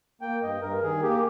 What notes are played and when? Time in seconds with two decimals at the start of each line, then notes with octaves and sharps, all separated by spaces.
0.21 A#3 G5
0.42 G2 D#5
0.62 G2 A#4
0.82 D#3 G#4
1.02 A#3 G4